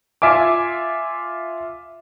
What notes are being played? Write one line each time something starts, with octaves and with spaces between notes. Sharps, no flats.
F4 E5 G#5 D6